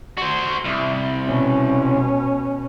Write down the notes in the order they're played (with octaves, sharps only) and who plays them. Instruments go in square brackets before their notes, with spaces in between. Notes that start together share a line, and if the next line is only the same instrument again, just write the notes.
[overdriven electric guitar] F#4 C5
C2
[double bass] B2 C#4